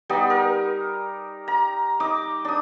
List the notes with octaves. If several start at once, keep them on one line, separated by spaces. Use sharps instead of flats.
G3 B3 D#4
A#4
A#5
D#4 D6
D4 D#6